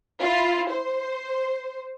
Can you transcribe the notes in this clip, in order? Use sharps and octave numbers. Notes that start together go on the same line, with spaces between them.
E4 F4
C5